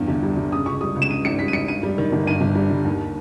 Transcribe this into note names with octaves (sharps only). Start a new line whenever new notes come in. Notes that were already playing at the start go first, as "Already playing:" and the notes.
Already playing: E2 G2
G1
G3
G1
C#3 D#6
C#2 C#6
G3 D#6
C#2
E7
G2 D#7
G#1 C#7
G3 B6
D#7
G#1 C#7
G2 D#7
G3
D#3
G1
G2 D#7
G1
G3
G1
D#2